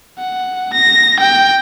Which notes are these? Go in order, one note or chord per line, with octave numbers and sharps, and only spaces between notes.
F#5
A#6
G5